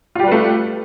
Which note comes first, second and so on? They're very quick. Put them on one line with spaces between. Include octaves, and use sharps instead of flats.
F4 G4 G3 B4 A3